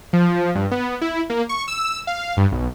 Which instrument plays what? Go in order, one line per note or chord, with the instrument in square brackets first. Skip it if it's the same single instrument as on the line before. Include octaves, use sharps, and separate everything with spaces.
[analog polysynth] F3
G2
B3
E4
A#3
C#6
E6
F5
G2
B1